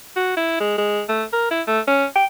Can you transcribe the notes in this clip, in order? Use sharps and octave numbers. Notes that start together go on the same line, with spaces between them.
F#4
E4
G#3
G#3
A3
A#4
E4
A3
C#4
G5